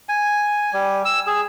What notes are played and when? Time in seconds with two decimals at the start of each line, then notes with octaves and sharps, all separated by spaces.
0.09 G#5
0.73 G3
1.05 E6
1.27 G#4